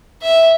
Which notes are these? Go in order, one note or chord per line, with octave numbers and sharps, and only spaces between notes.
E5